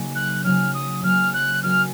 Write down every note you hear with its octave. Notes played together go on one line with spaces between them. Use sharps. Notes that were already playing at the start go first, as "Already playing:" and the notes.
Already playing: C#3 F#3 A#3 D#4
F#6
C#3 F#3 C#4 F6
D#6
C#3 F#3 A#3 C#4 F6
F#6
F#3 C#4 F#4 A#4 F6